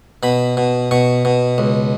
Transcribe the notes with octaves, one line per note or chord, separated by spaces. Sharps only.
B2 B5
B2
B2 C#6
B2
C#2